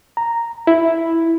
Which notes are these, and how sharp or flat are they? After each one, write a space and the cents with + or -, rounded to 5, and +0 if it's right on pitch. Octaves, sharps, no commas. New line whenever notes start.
A#5 -5
E4 +0